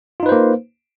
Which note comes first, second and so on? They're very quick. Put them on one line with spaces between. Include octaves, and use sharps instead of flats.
F4 D#4 B4 C5 A#3